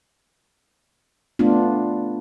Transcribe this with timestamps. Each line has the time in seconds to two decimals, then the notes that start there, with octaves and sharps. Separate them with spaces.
1.39 A3 B3 D4 F4